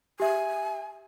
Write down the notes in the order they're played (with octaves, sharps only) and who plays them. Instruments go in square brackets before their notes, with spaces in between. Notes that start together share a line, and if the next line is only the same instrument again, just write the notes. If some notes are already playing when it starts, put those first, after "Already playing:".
[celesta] G4 E5 [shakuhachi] G#5